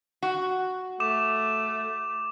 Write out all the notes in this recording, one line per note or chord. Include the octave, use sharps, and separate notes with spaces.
F#4
A3 D6 E7